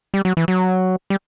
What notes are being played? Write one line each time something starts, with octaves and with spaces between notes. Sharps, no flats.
G3
F#3
E3
F#3
G3